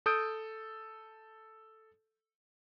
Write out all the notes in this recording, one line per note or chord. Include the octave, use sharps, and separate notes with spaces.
A4 D#6 G6 D7